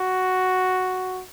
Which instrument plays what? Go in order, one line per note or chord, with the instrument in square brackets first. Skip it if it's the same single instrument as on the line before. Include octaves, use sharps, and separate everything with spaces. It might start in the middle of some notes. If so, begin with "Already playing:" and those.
Already playing: [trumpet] F#4